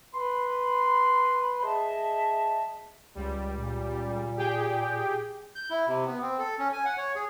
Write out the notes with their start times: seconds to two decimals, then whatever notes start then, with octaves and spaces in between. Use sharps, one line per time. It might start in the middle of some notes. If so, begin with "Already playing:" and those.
0.14 B4 B5 C6
1.63 G#4 D#5 E5 A5
3.15 C#2 G3
3.56 A#2
4.37 G4 G#4 G5
5.56 G6
5.70 E4
5.87 C3
6.06 B3
6.22 C4
6.39 A4
6.59 C#4
6.73 G#5
6.85 F#5
6.97 C#5
7.16 G#4